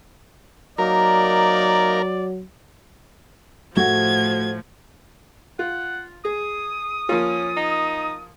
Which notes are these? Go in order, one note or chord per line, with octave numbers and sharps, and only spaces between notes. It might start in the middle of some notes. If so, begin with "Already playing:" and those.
F#3 A#3 D#4 A#4 D5
A2 F3 A3 F#4 G#6
F4 F#5
G#4 D#6
F3 A#3 C#4 F4
D#4